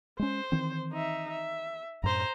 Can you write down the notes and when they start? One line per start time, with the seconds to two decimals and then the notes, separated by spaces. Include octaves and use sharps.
0.19 G#3 C#4 C5
0.52 D#3 E3 C4
0.93 D#4 E5
1.31 E5
2.03 F#2 A2 C5 A#5